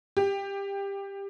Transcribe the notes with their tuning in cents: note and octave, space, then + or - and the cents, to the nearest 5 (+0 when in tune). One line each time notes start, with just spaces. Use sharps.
G4 +15